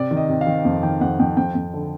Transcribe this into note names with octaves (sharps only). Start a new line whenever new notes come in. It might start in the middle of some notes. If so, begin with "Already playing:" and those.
Already playing: C3 D5
D#3
D#5
C3
F5
D#3
F2
D#3 G5
F2 F#5
F2 G5
F2 G5
F2
D3